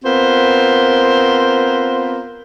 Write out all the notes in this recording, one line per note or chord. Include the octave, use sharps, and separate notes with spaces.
B3 C4 F4 A#4 C5